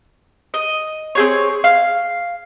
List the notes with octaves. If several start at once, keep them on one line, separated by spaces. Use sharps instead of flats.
D#5
C4 G#4 C#5
F5